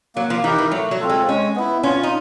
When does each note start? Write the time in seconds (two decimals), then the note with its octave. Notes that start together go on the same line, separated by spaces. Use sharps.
0.15 F#3 A#3
0.30 F3
0.43 E3 D#4 G4 A#4
0.58 E3
0.71 F#3 A3
0.91 F#3
1.00 C4 F4 A4
1.09 G#3
1.28 G#3 C#4
1.56 B3 E4
1.83 C#4 F4
2.03 D#4